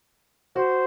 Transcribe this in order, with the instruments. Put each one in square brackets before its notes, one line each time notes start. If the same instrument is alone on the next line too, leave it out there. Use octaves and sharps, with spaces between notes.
[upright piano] F#4 [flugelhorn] C5